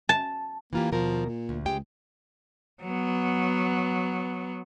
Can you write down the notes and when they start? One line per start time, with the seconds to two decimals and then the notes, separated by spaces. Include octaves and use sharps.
0.09 A5
0.73 E3 A#3 F4 G4
0.92 D#2 B2 F3 A#4
1.26 A#2
1.49 D2
1.66 C#2 G#3 G4 G5
2.83 F#3 B3